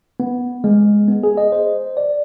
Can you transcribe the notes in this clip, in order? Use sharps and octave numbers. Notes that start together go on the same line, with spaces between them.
B3
G#3
B3
G#4
D#5
C5
D5